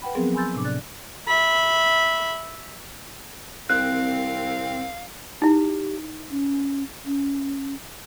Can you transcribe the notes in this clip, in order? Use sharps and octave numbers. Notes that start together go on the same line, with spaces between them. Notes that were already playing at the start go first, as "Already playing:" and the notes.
B4 F#5 G5 B5
F3 F#3 B3 C4 G#4 A#4
G#5 B5 C6 E6 G6 A6
A2 C3 D4 D6
D5 F#6 A6
E5 B5
C2 C4 A#4 F5 F#6
D#4 E4 G4
C#4
C#4